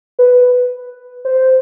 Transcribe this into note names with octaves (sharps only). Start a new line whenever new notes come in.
B4
C5